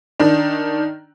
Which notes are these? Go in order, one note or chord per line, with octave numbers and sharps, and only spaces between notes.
D#3 D4